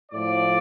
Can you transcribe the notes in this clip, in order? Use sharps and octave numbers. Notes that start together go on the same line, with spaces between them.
A2 F3 D5